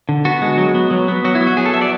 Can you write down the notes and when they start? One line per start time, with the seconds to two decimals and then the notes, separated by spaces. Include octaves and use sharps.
0.09 D3
0.25 B3 F#4
0.42 G#3
0.58 F#3
0.75 B3
0.91 F#3
1.08 B3
1.24 F#3 F#4
1.35 E4
1.41 B3
1.47 F#4
1.57 F#3 G#4
1.66 A4
1.74 B3 E5
1.82 D5